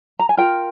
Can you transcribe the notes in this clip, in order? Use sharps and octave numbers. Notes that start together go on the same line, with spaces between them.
A#5
G#5
F4 A#4 G5